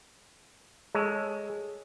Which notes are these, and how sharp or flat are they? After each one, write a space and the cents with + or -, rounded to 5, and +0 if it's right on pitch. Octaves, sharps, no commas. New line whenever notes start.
G#3 +0 A4 +0 C#5 +0